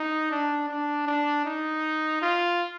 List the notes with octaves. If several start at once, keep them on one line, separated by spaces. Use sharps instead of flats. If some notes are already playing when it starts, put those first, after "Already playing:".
Already playing: D#4
D4
D4
D4
D#4
F4